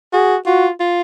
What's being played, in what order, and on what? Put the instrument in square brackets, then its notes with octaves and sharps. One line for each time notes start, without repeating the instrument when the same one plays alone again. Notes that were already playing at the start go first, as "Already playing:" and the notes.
[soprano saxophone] F#4 [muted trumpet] G#4
[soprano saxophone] F4 [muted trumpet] F#4
[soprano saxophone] F4